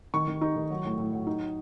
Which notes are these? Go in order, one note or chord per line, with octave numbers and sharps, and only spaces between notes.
D#3 C#6
D#3
D#4
D#3
F#3
A2
A2
F#3
D#4